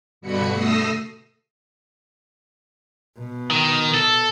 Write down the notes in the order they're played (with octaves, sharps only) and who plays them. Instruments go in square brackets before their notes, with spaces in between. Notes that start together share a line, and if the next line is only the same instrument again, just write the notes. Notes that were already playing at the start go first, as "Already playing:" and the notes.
[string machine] G2 B2 D3 F#4 B5 C#7
A3 D#6 E6 A#6 C7
[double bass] B2
[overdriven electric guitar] D#3
A4